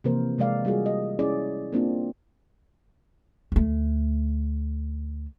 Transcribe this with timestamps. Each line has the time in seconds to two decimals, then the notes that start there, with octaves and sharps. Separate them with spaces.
0.04 C3 E3 F3 A#3 A#4 C5
0.38 C3 G#3 A#4 D5 F5
0.65 G3 F4 F#4 G#4
0.86 D#5
1.19 C#4 E4 G#4 D5
1.72 A#3 C4 D4 F4
3.52 D2 A3